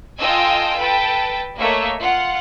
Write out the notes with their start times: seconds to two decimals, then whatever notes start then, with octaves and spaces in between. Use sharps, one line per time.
0.17 F4 A4 D#5 G5 G#5 E6
0.78 A4 B4 G5 A5
1.58 A3 A#3 C#5 D#5 E5
1.99 F4 F#5